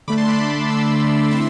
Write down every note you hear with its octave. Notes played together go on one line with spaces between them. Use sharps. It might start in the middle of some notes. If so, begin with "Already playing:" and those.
D3 A3 D4 B5 D6
A5 C6
B5 D6
C6 E6
D3 A3 C4 E4 C6 E6